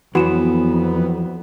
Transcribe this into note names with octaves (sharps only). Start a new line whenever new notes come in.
F2 E3 F#3 B3 F#4 E7